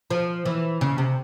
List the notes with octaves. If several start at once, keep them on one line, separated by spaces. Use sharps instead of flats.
F3
E3
C#3
C3